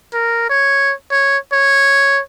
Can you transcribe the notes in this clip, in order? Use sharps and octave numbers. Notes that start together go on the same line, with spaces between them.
A#4
C#5
C#5
C#5